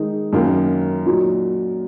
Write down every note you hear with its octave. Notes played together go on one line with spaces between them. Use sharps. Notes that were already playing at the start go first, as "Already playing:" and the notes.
Already playing: D#3 G#3 D#4
F#2 D#3 A#3
A#2 F#3 D#4